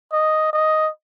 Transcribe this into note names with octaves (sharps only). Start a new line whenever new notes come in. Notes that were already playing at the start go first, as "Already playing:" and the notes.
D#5
D#5